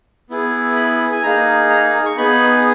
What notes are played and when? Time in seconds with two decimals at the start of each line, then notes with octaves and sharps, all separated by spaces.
0.30 B3 E4 G#4
0.76 B5
1.12 G#5
1.23 A#3 D#4 G#4 A#5
1.70 A#5
2.06 C#6
2.17 B3 D#4 G#4 B5